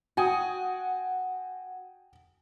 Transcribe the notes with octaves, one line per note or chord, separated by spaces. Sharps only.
F#4 G5 G#5 D#6